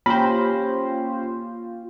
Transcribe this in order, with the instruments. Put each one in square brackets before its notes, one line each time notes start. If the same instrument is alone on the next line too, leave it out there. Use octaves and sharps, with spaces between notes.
[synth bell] A#3 [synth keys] C#4 G4 C5 [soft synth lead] F4 [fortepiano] B5